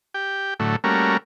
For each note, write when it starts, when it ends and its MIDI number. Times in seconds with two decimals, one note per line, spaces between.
0.14 0.54 67
0.14 0.54 79
0.60 0.76 45
0.60 0.76 50
0.60 0.76 54
0.60 0.76 57
0.84 1.17 55
0.84 1.17 57
0.84 1.17 58
0.84 1.17 61
0.84 1.17 66
0.84 1.17 70